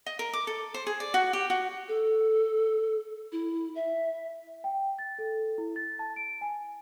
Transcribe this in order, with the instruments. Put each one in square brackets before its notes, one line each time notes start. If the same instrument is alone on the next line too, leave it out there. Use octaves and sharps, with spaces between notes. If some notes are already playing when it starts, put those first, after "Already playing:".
[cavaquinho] D#5
A#4
D6
A4
C5
G#4
D5
F#4
G4
F#4
[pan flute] A4
E4
E5
[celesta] G5
A6
A4
E4
A6
A5
D7
G#5